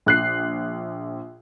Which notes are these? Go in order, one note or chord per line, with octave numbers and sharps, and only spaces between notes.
A#1 F#6 C7